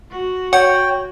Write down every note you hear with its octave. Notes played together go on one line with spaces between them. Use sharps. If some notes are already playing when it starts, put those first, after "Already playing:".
F#4
C#5 F#5 G5